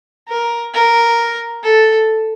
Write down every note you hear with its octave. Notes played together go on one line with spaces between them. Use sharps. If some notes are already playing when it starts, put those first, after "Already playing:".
A#4
A#4
A4